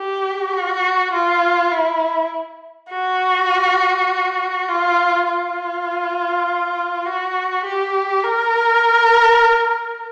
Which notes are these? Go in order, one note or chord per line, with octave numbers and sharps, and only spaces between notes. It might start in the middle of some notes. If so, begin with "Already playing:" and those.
Already playing: G4
F#4
F4
E4
F#4
F4
F4
F#4
G4
A#4